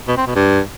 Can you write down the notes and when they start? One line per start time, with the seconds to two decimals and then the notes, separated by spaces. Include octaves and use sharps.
0.08 B2
0.17 C4
0.27 B2
0.36 G2